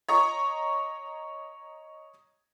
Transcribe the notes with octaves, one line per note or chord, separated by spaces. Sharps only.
C#5 D#5 A#5 C#6